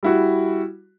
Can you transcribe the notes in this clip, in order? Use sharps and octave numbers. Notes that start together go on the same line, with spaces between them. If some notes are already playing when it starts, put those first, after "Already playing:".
G3 E4 F#4